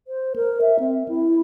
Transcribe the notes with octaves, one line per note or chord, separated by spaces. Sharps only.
C5
A#4
E5
C4
E4